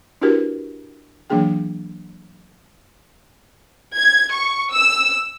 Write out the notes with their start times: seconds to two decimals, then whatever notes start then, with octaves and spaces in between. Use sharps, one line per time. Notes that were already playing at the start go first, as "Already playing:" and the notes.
0.21 D4 E4 F#4 G4 A#4 B4
1.30 E3 F#3 A#3 D4 G#4 G5
3.97 G#6
4.32 C#6
4.73 E6